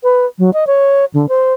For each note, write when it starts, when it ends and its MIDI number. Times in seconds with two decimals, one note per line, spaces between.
0.03 0.26 71
0.39 0.50 54
0.54 0.67 75
0.67 1.05 73
1.14 1.29 50
1.29 1.53 72